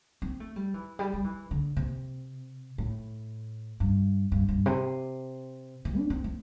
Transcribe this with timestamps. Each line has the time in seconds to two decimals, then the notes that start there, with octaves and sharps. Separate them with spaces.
0.22 C4
0.40 A3
0.56 G3
0.74 E3
0.99 G3
1.14 G3
1.24 E3
1.51 D3
1.76 C3
2.78 A2
3.80 G2
4.32 G2
4.49 G2
4.66 C3
5.85 E3
5.97 D4
6.10 C4
6.24 A3